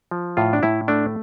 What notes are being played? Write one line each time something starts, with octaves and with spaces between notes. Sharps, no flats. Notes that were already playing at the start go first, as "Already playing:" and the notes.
F3
A2 F4
D4
A2 E4
A3 D4